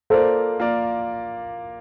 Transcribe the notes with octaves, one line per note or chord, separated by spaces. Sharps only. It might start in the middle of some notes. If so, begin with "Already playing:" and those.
A#3 F4 A4 A#4 C5 D5
A#3 F4 A#4 D5